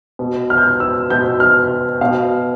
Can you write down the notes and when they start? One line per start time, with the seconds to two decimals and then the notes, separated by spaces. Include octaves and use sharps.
0.19 B2
0.50 F6
0.58 G6
0.65 F6
0.80 E6
1.10 B2 G6
1.40 F6
2.01 B2 F5